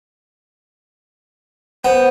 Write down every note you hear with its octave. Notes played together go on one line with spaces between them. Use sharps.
B3 C5